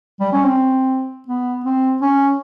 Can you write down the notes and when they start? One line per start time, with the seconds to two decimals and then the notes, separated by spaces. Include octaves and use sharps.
0.20 G3
0.32 C#4
0.44 C4
1.28 B3
1.65 C4
2.01 C#4